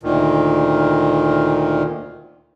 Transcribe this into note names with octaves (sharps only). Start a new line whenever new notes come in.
D2 A#2 D#3